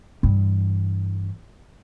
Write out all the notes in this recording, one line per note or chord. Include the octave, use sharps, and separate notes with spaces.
G2 E3